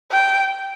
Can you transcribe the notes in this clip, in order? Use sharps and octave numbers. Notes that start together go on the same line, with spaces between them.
G5